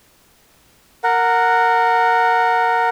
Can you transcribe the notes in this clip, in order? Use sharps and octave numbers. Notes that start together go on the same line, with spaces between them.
A#4 F#5